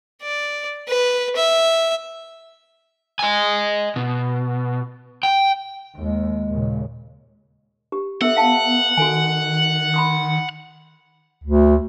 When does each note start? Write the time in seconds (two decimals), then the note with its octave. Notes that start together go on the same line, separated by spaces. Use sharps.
0.22 D5
0.87 B4
1.36 E5
3.19 D#5 G#5
3.96 B2
5.23 G5
5.97 D#2 G#3
6.48 D#2 A#2 C#3
7.92 G4
8.21 B3 A4 E5 F#5 E6
8.37 F5 A5
8.97 D#3 F#4 A4 G#5
9.94 B5 C6 D#6
11.44 D2